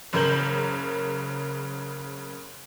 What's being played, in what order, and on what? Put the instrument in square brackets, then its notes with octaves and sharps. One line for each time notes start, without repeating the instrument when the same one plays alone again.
[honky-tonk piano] F#1 C#3 A#4 G6 F#7